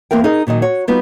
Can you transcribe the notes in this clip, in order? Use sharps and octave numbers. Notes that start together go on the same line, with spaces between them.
E2 A#3 C4 A#4 G5
D#4 G#4 A#4 D#5
A#2 D#3 F#3 D#5
F#4 C#5
G3 B3 D#4 F4 F#4